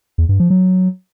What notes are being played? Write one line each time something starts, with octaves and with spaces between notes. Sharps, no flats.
E2
G2
F3
F#3